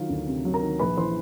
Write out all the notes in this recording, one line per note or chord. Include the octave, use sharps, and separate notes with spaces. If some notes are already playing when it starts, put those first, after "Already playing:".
Already playing: D#3 F#3 F4 F5
D2
C3
F#3
A#4 A#5
D#3
A#1 B4 B5
E3 C5 C6